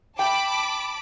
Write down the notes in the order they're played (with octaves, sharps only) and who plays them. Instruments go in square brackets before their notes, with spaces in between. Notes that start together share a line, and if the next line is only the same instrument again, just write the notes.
[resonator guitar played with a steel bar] G5 [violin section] A5 B5 D6